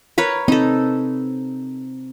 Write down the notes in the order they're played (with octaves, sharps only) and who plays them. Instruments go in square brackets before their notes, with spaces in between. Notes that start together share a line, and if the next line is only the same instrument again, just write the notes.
[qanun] A#4 B4 C#5
[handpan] C4 [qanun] D#4 A4